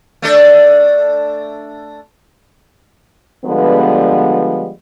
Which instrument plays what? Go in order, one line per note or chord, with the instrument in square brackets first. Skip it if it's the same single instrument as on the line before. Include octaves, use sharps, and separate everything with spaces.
[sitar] A3 D4 A4
[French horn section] D3 F3 G3 G#3 B3